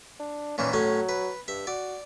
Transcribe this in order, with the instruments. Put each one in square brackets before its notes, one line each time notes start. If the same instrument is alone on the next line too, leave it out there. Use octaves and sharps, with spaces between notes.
[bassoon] D4
[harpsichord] A#2 D#3 E3 [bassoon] C#4
[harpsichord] A2 C#4 [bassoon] F#3
[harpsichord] B4
[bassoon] G2 [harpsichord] E5
[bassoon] F#4 [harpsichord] D5